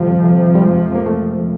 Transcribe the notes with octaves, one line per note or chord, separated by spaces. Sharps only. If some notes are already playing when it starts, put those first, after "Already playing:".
Already playing: F2 C3 D#3 F3 G3
G3
G#3
A#3
A3